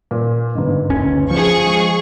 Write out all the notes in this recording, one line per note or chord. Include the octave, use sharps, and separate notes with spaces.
A#2
G1 G#2
F#1 D2 C#4
F3 G#4 C#6
G#3